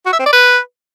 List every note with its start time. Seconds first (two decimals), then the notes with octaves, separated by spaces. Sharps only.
0.06 F#4
0.13 E5
0.19 C4
0.26 D5
0.33 B4